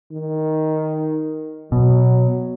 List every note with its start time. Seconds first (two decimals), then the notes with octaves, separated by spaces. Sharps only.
0.12 D#3
1.72 B2 F#3